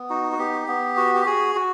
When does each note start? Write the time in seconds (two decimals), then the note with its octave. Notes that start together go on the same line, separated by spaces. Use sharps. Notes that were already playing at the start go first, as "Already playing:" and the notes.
Already playing: B3
0.10 D#4 F#4
0.32 F#4
0.39 B3 G4
0.68 B3
0.97 F#4
1.15 G4
1.26 F#4 G#4
1.55 F#4